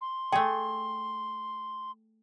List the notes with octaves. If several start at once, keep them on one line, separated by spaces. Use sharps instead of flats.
C6
A3 G#4 G5